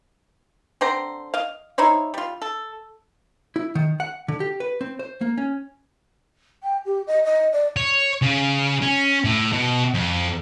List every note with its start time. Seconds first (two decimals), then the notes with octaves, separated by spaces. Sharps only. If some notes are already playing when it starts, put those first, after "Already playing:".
0.81 D3 C4 C5 A#5
1.34 D#5 F5
1.78 D#4 E4 C5 C#5
2.14 G3 F4
2.42 A4
3.56 E4
3.75 D#3
4.00 F#5
4.28 D3
4.40 G4
4.60 B4
4.81 C4
4.99 C5
5.21 A#3
5.38 C#4
6.63 G5
6.85 G4
7.07 D#5
7.24 D#5
7.52 D5
7.77 C#5
8.22 C#3
8.82 C#4
9.24 A2
9.53 B2
9.94 F2